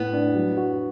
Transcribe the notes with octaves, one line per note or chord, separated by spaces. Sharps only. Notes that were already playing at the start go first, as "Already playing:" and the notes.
Already playing: A2 B3
D4
F#3
F#4